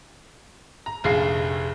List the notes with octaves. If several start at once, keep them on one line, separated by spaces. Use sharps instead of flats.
A#5
F1 A#1 G#4 F5 C7